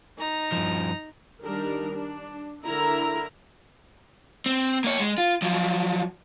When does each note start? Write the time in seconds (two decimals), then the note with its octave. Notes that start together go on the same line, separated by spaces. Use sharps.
0.18 D#4 A#5
0.52 G2 F3
1.44 D#3 G3 D4 A#4
1.92 D4
2.66 D3 E4 A#4 E5 A#5
4.46 C4
4.84 A#3 C#5
5.00 G#3
5.18 F4
5.42 F3 F#3